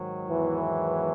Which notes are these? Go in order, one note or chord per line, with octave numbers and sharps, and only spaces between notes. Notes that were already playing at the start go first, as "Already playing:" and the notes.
Already playing: G#2 D#3 F#3
E2 E3